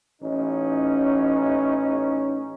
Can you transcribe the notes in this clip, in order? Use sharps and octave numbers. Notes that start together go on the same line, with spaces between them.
A1 C#4 D#4